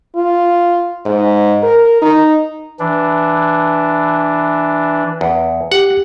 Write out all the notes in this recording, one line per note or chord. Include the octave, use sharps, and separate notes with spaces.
F4
G#2
A#4
D#4
E3 D4
E2
G4 F#5